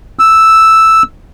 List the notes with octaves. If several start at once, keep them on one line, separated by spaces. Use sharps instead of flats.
E6